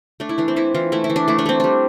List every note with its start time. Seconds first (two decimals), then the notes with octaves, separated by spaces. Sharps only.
0.20 A3 D4
0.29 E4
0.38 E3 D4
0.48 C4
0.56 E3 E4
0.74 E3 F4
0.92 A3 E4
1.04 E4
1.10 E3
1.16 D4
1.28 A3 E4
1.39 D4
1.46 A3 C4
1.60 G3 D4